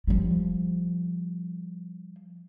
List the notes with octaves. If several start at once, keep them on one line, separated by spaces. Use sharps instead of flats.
F3 G3